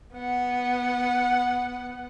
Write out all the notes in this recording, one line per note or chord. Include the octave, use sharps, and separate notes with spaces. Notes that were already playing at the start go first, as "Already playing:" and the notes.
B3 F#5